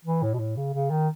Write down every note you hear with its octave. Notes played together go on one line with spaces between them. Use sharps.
E3
A2
B2
A2
C#3
C#3
D#3